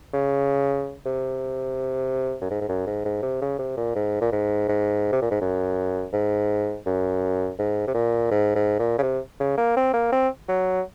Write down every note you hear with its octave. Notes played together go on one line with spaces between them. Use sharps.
C#3
C3
F#2
G#2
G#2
F#2
G#2
G#2
C3
C#3
C3
A#2
G#2
A#2
G#2
G#2
C3
A#2
G#2
F#2
G#2
F#2
G#2
C3
A#2
G#2
G#2
A#2
C#3
C3
C#3
A#3
C4
A#3
C4
F#3